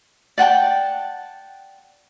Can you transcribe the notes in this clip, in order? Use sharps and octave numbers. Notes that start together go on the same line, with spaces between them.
D5 F#5 G5 A5